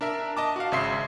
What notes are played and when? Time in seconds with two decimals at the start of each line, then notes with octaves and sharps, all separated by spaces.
0.01 D4 A#4 E5
0.37 D#5 A5 D6
0.56 F#4 F5
0.72 G#1 C#3 E5 C6 C7